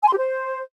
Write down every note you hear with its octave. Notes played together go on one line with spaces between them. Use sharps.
G#5
C6
G4
C5